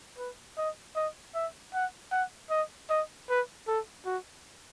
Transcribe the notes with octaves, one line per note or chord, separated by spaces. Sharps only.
B4
D#5
D#5
E5
F#5
F#5
D#5
D#5
B4
A4
F#4